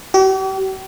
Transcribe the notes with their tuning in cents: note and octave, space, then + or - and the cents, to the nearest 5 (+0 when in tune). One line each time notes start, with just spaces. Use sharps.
G4 -45